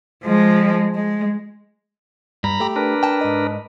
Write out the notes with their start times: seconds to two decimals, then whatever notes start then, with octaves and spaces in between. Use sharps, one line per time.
0.23 F3 G#3
0.95 G#3
2.44 G2 A#5 B5
2.60 A3 G4
2.76 D4 A#4 B4
3.03 G5 A5
3.21 G#2 D#5